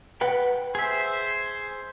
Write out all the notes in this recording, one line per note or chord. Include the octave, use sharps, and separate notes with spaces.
B4 F#5 G5
G#4 C5 E5